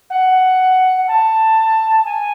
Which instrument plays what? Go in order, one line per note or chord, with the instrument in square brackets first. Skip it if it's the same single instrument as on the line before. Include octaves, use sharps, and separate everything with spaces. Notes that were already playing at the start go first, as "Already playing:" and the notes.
[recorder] F#5
A5
G#5